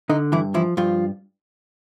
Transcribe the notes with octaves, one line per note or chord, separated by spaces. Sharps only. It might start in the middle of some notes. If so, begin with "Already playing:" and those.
D3 D#4
G2 E3 E4
E3 F3 E4
G2 F3 F4